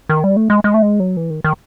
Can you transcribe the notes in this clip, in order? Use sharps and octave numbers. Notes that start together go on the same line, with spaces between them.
D#3
G3
A3
G#3
G#3
A3
G#3
F#3
E3
D#3
D#3